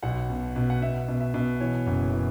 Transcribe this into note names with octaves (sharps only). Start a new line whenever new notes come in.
B1 F#5
B2
B2
F#5
B2 E5
B2
E5
B2
E3 C#5
F#1
E3